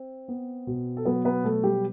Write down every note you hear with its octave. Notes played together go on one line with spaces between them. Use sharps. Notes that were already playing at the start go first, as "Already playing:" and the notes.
Already playing: C4
B3
B2
A4
F#3 B3 B4
B3 B4
B2 A3 A4
G3 G4